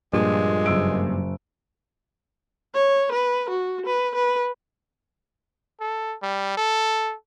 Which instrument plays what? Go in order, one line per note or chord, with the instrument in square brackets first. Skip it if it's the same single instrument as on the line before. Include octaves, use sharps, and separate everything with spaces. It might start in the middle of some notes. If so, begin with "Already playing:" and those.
[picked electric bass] G2 [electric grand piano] A#2 F3 [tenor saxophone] G#3
[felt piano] F#1 E6 D7
[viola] C#5
B4
F#4
B4
B4
[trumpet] A4
G3
A4